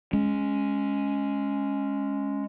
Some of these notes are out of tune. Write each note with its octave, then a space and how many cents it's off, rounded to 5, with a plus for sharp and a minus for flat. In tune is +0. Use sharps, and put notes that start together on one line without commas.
G#3 +0 C#4 +0